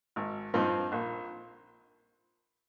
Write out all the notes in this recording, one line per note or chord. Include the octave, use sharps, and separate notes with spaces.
G#1
G2 F3 C4 D#4
A#1